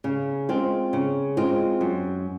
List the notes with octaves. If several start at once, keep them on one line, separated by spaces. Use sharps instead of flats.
C#3
G#3 C4 F4
C#3
G#3 C4 F4
F#2